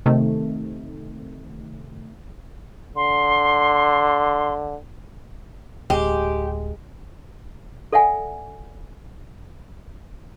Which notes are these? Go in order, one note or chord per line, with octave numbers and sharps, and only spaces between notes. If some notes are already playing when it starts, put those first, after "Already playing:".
C3 D#3 A3
D3 C6
D1 G#3 G4
A4 D5 E5 F#5 G#5